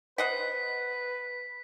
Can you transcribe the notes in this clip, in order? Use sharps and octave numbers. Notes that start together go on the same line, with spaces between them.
B4 C5 D#5 F#5 B6